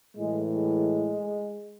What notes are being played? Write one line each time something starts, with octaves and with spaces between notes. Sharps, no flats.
A2 E3 G#3
G#3